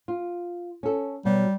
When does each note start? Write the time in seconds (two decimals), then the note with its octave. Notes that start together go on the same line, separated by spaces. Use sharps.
0.08 F4
0.83 C#4 A4
1.25 B2 F#3 G3